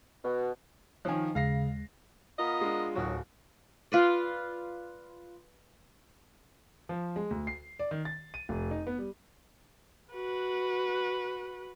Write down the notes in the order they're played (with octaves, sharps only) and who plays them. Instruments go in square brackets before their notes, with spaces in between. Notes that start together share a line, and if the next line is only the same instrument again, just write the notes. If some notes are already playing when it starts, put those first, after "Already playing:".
[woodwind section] B2
[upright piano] D#3 F3 [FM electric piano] C#5 G#5
[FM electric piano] D#2 G#3 [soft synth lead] C#3 [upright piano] F5 A#6 C7
[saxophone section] B3 A#4 D#5 [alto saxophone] F4
[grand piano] G#3 D4
[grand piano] D1 F#4 [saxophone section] D#3 F#3
[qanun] F4 B4 D5
[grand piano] F3
G#3
D2
C7
D5
D#3
A6
D#7
F1
D#4
B3
G3
[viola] F#4 B4